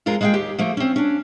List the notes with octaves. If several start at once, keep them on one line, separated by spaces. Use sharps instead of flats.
F2 G#3 F4 A#4
G#3 A#3 G#4 F5 G5
D#2 G4
F3 A3 A#3
C4 C#4
C#4 D4